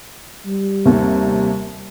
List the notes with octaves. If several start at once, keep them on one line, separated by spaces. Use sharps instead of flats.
G3
D#2 C3